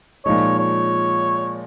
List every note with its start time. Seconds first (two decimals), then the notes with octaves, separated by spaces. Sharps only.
0.25 A#2 F3 G#3 D#4 C#5
0.58 C#5